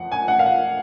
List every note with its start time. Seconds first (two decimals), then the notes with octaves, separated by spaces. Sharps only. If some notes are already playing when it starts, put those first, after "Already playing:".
Already playing: F2 F3 F#5
0.12 G#5
0.28 F#5
0.39 F5
0.46 F#5